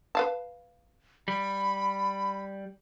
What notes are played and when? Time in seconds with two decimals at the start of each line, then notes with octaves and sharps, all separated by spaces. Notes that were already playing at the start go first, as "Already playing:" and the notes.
0.15 B4 F5 A5
1.28 G3 B5